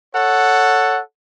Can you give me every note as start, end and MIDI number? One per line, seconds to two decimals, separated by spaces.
0.15 1.00 69
0.15 1.00 73
0.15 1.00 78